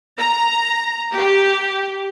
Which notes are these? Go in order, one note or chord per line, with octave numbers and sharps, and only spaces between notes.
A#5
G4